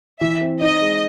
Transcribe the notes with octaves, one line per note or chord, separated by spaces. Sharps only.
E3 E5
C4
D#4 D#5
G#3